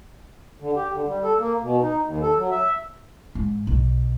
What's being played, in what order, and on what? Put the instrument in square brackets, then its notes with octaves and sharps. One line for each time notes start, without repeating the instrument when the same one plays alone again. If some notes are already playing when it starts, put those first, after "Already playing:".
[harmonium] D3
G4
D3
G3
A4
A#3
B2
D#4
D#2
A4
F#3
E5
[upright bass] G#2
B1